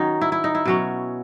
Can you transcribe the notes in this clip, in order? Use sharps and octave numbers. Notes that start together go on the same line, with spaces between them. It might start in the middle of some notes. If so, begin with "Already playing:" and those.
Already playing: D#3 F#3 C#4 D#4
E4
E4
D#4
E4
B2 F#3 C#4